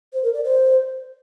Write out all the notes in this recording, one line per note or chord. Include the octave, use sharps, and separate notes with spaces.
C5
A#4
D5
C5